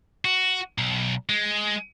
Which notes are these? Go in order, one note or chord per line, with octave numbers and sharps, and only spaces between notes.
F#4
B1
G#3